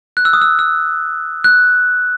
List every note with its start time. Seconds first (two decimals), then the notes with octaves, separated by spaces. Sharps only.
0.17 F#6
0.25 E6
0.33 D#6
0.42 E6
0.59 E6
1.44 F#6